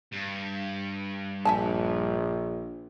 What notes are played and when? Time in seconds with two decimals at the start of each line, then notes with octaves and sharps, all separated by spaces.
0.12 G2
1.45 A#1 E5 G#5 A5